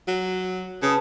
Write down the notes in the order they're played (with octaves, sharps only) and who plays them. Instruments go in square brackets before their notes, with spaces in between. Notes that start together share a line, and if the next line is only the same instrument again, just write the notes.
[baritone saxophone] F#3
[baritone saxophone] C#3 [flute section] B4 A5 D#6